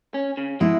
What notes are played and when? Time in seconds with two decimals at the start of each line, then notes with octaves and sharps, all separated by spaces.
0.14 C#4
0.37 C#3
0.60 B2 G#3 E4